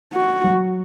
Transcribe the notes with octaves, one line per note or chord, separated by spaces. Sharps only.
F#4
F#3